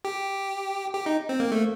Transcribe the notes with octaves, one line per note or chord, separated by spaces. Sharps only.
G4
G4
D#4
C4
A#3
A3